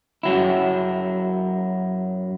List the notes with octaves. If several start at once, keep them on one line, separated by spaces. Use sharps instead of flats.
F#2 F#3 E4